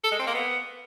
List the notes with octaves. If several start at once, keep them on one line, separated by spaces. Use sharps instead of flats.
A4
G#3
C4
A#3
B3